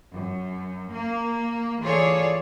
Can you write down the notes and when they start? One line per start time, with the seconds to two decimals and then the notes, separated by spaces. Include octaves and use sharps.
0.12 F#2
0.92 A#3
1.81 E3 F4 G#4 A4 C#5 D5